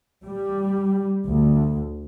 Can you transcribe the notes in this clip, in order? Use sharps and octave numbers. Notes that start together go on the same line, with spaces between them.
G3
D2